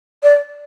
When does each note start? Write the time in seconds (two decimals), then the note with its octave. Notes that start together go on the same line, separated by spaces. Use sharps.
0.23 D5